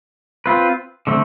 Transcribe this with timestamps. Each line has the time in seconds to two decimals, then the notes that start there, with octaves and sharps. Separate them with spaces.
0.46 C4 F4 B4
1.07 D3 A3 C4